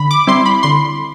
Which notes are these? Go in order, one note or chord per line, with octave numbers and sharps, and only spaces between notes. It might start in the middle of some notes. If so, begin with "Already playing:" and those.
Already playing: D3 B5
D6
G3 C4 E4 C6
B5
D3 C6